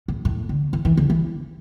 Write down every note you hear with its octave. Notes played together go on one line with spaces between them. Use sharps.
A2
A2
D3
E3
E3
D3
E3